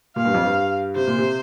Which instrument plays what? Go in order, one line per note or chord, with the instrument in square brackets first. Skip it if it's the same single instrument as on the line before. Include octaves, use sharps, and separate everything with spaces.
[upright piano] A#2 [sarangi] F5
[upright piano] G2
F2
G2
[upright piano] C3 [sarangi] C5
[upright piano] A#2
C3